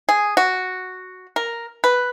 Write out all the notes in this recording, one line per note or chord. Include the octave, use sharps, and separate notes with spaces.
G#4
F#4
A#4
B4